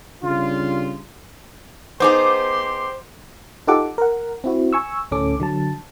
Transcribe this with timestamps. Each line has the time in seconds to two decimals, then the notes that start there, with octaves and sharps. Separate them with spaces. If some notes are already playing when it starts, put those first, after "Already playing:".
0.23 C#3 G3 D4 F4
2.00 B3 D#4 G4 G#4 C5 C6 D6
3.67 D#4 F4 G4 A4 F#5 D6
3.98 A#4 F#5
4.44 C4 E4 F#4
4.73 G#5 C#6 E6
5.11 D2 A2 C#4 A4 D6
5.40 D3 F#3 A5